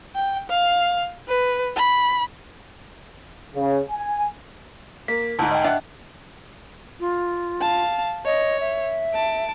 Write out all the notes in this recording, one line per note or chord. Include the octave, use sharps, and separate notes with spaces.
G5
F5
B4
B5
C#3
G#5
A#3 B6
D2 G#2 A5
D#5 G5
D4 E5 F#5
F4
F5 A5
C#5 D#5
E5
A5 D7